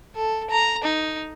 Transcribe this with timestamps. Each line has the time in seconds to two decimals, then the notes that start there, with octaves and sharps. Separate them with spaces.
0.16 A4
0.51 A#5
0.84 D#4